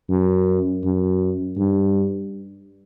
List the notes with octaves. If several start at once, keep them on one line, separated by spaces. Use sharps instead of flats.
F#2
F#2
G2